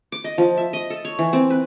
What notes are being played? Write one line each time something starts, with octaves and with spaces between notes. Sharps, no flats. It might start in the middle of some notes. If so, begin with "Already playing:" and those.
D6
D#5
F3
E5
D#5
A4
C#5
E3
C4
B4